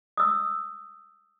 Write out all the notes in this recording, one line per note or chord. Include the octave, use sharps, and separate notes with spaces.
D#6 E6